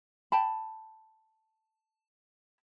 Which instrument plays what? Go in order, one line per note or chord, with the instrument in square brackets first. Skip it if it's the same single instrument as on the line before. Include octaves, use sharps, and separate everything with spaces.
[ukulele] G5 A5 B5